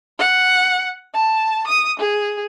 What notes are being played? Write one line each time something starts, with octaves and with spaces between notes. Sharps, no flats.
F#5
A5
D#6
G#4